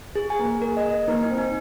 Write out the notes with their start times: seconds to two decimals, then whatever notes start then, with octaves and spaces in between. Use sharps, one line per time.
0.15 G#4
0.30 G#5
0.39 A#3
0.46 G#4
0.62 A#4
0.77 D#5
0.92 A#4
1.08 A#3 D#4
1.23 D#4
1.30 C4
1.38 D#4